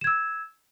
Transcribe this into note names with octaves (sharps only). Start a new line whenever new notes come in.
E6 G#6 E7